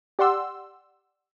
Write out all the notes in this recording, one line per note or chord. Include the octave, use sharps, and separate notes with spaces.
G4 D5 F#5 C6 E6